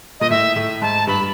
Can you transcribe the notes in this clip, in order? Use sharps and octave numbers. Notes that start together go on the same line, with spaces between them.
A#2 D#5
A2 E5
A2
G#2 A5
G2 B5